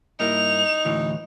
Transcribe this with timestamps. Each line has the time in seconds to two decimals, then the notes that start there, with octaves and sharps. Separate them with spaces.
0.20 G2 A#3 D#4 E4 F7
0.85 D2 A2 E3